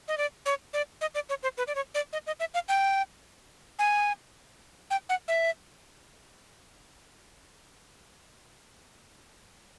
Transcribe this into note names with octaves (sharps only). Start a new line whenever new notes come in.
D#5
D5
C#5
D5
D#5
D5
C#5
C5
B4
D5
C#5
D5
D#5
D#5
E5
F5
G5
G#5
G5
F#5
E5